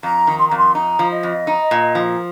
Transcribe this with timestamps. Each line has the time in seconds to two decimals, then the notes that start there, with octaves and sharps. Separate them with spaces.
0.03 F2 A#5
0.27 D#3
0.39 C6
0.48 F2 A#5
0.57 C6
0.75 D#4 A#5
0.99 F3
1.11 D#5
1.23 F2
1.47 D#4
1.71 A#2
1.95 F3